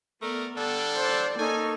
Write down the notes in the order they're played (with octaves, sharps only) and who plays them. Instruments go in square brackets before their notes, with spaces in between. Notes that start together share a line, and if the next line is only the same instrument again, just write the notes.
[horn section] A3 D5 [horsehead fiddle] B3 [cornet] A#4
[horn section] D3 G3 D4 [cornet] A4
[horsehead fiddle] C5 D5
[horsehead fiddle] A#3 [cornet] C#4 [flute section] D#4 A4 C#6 [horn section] G#5